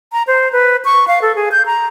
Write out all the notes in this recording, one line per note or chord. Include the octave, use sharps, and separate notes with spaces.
A#5
C5
B4
C#6
F5
A4
G#4
G6
A#5